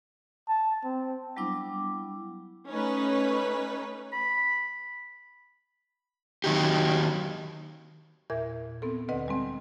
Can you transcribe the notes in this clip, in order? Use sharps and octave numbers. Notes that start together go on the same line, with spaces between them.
A5
C4
F#3 G3 B3 D4 E4 D6
A3 C#4 D#4 B4
B5
D#3 F#3 G4
E2 A#2 A#4 E5 G#6
B3 C4 A4
D2 D3 C4 B4 D#5 F#5
G3 G#3 C4